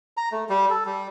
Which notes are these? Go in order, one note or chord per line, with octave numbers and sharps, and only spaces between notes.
A#5
A3
G3
A4
G3